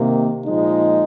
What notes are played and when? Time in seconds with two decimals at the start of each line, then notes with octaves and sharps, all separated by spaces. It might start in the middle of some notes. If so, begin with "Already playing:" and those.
Already playing: C3 D#3 A#3
0.46 A#2 F3 G#3 D#4